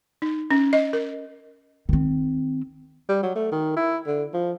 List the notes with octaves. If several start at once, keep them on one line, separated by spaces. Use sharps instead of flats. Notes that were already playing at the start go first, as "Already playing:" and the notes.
D#4
C#4
D#5
A#4
D#3 C4
G3
F#3
A3
D#3
E4
D3
F3